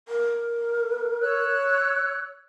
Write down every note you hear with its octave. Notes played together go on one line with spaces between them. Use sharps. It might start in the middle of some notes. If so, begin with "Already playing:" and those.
A#4
C#5 E6 F#6